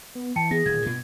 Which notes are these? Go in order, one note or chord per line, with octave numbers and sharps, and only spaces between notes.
B3
E3 G5 A5 C#7
B3 G#4 A#6
D1 A#2 D#3 G#6
G2 B2